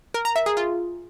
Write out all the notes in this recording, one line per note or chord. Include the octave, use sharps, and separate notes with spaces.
A#4
A#5
E5
G#4
F4